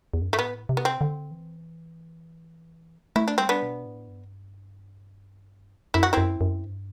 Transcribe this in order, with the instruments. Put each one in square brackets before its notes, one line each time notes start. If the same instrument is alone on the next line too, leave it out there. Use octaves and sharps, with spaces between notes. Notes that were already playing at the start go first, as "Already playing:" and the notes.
[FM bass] E2
F#2
G2
[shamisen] A3
[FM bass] A2 [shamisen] B3
[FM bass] C3
[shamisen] B3
C4
[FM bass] D3
E3
[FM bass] A3 [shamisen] E4
[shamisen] D4
[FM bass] G3 [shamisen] C4
[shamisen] B3 D4
[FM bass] B2
A2
G2
[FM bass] F#2 [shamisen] E4
[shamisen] F#4
[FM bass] F#2 [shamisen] C4 E4
[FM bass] F#2
G2